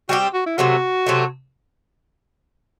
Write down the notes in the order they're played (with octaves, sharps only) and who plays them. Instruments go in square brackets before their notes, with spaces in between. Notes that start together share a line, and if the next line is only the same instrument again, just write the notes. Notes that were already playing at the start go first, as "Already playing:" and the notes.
[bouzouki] G3 C4 G4 [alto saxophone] F#4
[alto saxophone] F#4
E4
[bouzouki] C3 F#3 A3 [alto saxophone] F#4
[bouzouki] C3 F#3 A3